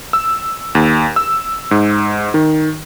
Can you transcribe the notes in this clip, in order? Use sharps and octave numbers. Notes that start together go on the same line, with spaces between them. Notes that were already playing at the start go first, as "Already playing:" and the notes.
E6
D#2
E6
G#2
D#3